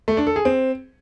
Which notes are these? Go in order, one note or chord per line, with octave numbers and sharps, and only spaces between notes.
A3
D4
A4
G#4
C4